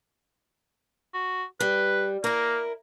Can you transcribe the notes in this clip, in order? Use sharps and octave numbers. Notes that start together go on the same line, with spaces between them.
F#4
G3 B4
A#3 E4 A#4